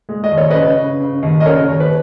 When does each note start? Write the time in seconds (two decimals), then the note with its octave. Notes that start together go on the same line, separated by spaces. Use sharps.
0.09 G#3
0.24 D#5
0.31 D#2
0.37 C#5
0.50 C#3 B4 D#5
0.77 C#3
1.00 C#3
1.23 D#2
1.40 D#5
1.46 C#3 A#4 C#5
1.68 D#2
1.80 B4